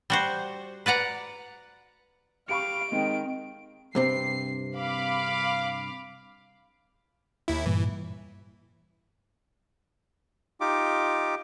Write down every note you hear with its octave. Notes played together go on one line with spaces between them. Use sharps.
G3 F#4 C5
B4 D5 F#5 A#5
G4 F5 B5 C#6 D7
D#3 G#3 C4
G2 C3 C4 C7
F5 B5 D6
D#2 E4
G2 A#2 E3
D#4 F4 G4 D6